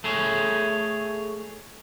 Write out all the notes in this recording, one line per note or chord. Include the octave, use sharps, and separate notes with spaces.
A3 G#4 C#5